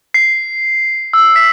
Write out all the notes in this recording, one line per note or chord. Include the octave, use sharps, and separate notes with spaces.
C7
E6
B6